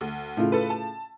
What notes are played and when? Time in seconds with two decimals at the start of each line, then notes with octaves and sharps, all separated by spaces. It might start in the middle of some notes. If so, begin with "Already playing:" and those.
0.01 D2
0.37 A2 C#3 F4
0.52 A4 B4
0.70 A5